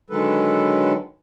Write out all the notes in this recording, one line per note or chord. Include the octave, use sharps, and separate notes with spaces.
D3 D#3 F#3 G#3 A4 B4